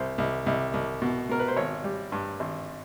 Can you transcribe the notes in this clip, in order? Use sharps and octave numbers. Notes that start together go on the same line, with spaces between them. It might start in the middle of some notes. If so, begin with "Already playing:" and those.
Already playing: C2 C5
C2
C2
C2
B2
B2 A#4
B4
C5
G#1 C#5
G3
G2
G#1